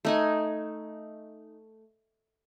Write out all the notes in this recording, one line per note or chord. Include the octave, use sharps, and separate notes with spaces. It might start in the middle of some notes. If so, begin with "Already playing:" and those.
A3 D#4 G#5